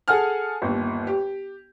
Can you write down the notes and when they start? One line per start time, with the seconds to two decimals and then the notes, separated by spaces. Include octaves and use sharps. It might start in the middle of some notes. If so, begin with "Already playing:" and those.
0.08 G#4 A4 F#5 G#5 F6
0.62 G1 D#2
1.07 G4